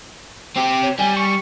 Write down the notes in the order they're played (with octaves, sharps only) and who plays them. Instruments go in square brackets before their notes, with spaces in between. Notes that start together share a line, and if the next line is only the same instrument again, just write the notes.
[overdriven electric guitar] C4 G4
[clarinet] C#5
[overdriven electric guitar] G3 [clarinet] G#5
[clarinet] C#6